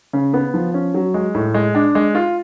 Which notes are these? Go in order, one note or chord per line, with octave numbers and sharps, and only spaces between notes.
C#3
B3
F3
C#4
F#3
G#3
A2
G#3
D4
G#3
F4